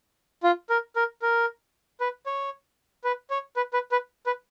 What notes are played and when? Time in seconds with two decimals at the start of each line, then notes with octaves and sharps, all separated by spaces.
0.43 F4
0.70 A#4
0.96 A#4
1.22 A#4
2.01 B4
2.26 C#5
3.04 B4
3.30 C#5
3.56 B4
3.73 B4
3.92 B4
4.26 B4